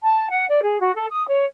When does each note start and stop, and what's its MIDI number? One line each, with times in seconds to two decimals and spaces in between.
0.04 0.28 81
0.30 0.45 78
0.48 0.59 74
0.61 0.79 68
0.80 0.93 66
0.95 1.05 69
1.11 1.24 87
1.28 1.45 73